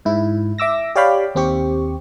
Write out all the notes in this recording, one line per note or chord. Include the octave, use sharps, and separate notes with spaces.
G#2 E4
E5 D6 E6 A#6
G4 C#5 D5 F5 G5 B5
D#2 C4 G4 C#6